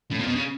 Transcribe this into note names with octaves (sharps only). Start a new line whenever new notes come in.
A2 C#4
A#2
B2
C#3